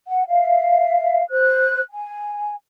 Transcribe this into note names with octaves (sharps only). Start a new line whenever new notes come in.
F#5
E5 F5
C5 F#6
G#5